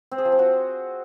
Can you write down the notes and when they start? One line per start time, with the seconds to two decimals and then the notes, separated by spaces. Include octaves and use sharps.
0.12 C4
0.18 G#4
0.25 F3
0.32 C4
0.39 F#4